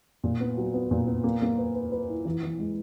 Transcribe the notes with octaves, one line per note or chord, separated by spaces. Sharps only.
A#2
B3
F#3
B3
A#2
B3
A#3
A#3
B4
B4
B4
E4
E3
E3
G#3